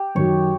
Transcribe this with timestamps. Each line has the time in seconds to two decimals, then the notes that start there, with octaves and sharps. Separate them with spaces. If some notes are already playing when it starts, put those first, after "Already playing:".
Already playing: G4
0.15 F#2 D#3 F#3 C#5